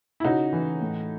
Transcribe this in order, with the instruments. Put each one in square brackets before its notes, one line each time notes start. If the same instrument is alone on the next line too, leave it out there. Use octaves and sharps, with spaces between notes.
[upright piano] E4
C#3 D#4 F#4
E3
A2